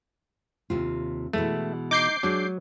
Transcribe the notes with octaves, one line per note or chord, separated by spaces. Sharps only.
D#2 C3 F4
B2 E3 G#3 A3
D#4 D6 G6 C7
F#3 G#3 D4